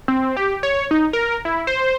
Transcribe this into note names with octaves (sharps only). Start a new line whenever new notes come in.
C4
G4
C#5
D#4
A#4
E4
C5